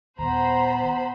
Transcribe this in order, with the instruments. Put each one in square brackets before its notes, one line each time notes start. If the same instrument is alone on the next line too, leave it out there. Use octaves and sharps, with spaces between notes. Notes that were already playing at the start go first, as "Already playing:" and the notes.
[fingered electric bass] D#1 D#2 [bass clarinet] B3 [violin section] C5 B5 [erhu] A#5